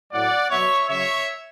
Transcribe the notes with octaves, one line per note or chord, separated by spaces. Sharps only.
A2 F#3 D5 F#5
B2 F#3 C#5 E5
C#3 F#3 C#5 E5